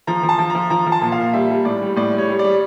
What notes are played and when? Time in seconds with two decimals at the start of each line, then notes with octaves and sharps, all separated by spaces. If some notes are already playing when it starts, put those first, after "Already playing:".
0.07 F3 A#5
0.23 F3
0.29 A5
0.39 F3
0.50 F3 A#5
0.70 F3 A#5
0.86 F3
0.92 A5
1.01 A#2
1.12 F5
1.18 A#2
1.33 G3 E5
1.50 G3
1.65 A2 D5
1.82 G3
1.96 A2 D5
2.13 G3
2.18 C#5
2.28 G3
2.39 G3 D5